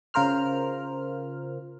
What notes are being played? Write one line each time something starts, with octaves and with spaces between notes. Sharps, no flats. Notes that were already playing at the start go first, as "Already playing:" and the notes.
C#3 F4 A#4 C5 F6